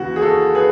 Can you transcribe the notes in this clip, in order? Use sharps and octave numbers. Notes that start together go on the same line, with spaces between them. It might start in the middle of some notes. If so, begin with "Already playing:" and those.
Already playing: D#2 C#3 E3 F#4
G#4
F#4 A4
G#4 B4